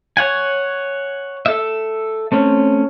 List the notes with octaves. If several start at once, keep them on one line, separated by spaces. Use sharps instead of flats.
C#5 F#5 G#5
A4 E5
A3 C4 C#4